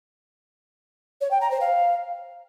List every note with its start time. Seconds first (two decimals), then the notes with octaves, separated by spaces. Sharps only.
1.21 C#5
1.30 G5
1.40 A#5
1.50 C5
1.60 F5